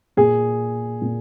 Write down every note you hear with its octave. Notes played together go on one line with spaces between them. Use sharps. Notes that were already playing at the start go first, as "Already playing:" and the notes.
A#2 G#4
A#2